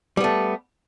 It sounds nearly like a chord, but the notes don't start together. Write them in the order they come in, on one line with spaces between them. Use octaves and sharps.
G3 B3 A3